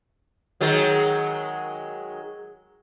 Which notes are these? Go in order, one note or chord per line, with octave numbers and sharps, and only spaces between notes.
D#3 F#3 G#3